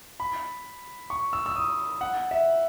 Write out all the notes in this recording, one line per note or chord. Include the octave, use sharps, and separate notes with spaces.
B5
C#6
E6
E6
D#6
F#5
E5